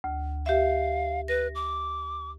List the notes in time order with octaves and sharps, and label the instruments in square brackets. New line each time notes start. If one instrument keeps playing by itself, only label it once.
[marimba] D2
[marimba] G4 E5 [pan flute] F5
[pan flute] B4 [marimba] A#6
[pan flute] D6